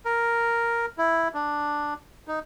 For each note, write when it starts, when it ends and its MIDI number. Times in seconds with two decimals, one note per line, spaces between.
0.05 0.86 70
0.98 1.28 64
1.34 1.94 62
2.28 2.39 63